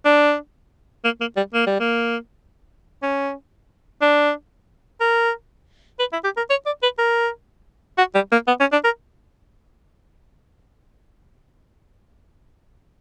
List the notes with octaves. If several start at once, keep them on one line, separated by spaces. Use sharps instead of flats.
D4
A#3
A#3
G3
A#3
G3
A#3
C#4
D4
A#4
B4
E4
G4
A#4
C#5
D5
B4
A#4
F#4
G3
A#3
B3
C#4
D4
A#4